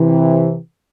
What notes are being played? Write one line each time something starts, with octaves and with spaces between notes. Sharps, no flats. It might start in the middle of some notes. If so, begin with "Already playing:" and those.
Already playing: C3 E3